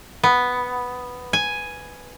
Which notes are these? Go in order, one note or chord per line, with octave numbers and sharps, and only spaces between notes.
B3
G#5